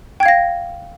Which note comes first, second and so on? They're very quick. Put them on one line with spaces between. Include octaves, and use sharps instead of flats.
G5 G#6 F5 A#6